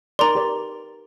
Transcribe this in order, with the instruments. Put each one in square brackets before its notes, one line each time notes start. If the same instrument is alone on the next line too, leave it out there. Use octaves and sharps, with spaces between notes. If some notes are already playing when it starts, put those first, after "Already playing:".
[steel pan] D#4 A#4 D5 [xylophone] A#5 C6
[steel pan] G4 B4 D5